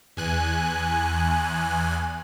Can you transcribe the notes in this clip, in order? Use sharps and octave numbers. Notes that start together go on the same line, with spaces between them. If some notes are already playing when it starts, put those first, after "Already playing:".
E2 G#5 F#6